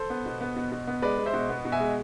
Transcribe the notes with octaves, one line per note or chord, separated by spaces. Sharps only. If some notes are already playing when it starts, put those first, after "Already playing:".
Already playing: A4 C5
B3
B2
B3
B2
B2
B3
G#3 B4 D5
G#3
C5 E5
B2
B3
B2
E5 G#5
G#3